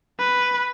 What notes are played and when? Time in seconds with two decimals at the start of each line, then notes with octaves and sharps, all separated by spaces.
0.19 B4